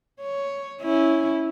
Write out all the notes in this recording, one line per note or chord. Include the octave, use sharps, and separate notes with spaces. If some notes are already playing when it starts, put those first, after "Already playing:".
C#5
C#4 E4